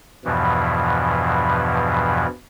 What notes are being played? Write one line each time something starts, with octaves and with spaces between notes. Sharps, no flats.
E2 G2 B2 E3 F3